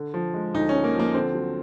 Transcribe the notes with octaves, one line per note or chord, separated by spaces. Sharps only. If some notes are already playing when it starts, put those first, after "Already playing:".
Already playing: D3
F3
G#3
D2 D#4
C#4
D3
A#3
F3 A#3
D3 C4
F#3